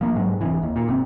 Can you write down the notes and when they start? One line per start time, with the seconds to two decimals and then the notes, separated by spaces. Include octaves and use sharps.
0.01 F3 A#3
0.15 G#2 F#3 G#3
0.41 F1 C3 E3
0.63 D#2
0.76 A#2
0.88 G#1 C3 C4